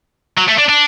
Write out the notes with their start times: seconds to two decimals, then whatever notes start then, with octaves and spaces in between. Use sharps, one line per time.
0.37 F#3
0.48 A3
0.58 D4
0.69 D4